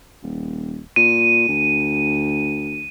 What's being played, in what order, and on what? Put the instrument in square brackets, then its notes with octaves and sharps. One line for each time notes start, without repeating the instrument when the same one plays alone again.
[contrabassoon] D#1
[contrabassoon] A#2 [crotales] D#7
[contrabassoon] D2